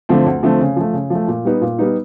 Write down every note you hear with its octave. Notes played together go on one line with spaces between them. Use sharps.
D3 F3 A3 C4
D2
D3 F3 A3 C4
C#3
F3 A3
C#3
F3 A3
A#2
G3 B3 D#4
A#2
G3 B3 D#4